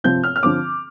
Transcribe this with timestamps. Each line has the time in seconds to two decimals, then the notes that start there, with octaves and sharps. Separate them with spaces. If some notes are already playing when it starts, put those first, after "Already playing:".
0.04 C3 F3 C4 G6
0.24 F6
0.36 F6
0.43 D3 F3 C4 D6